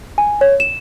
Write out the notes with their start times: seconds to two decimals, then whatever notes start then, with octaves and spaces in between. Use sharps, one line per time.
0.18 G#5
0.41 C#5
0.60 E7